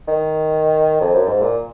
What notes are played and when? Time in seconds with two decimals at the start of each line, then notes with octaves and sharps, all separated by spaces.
0.08 D#3
1.01 F2
1.14 F#2
1.27 G#2
1.41 A#2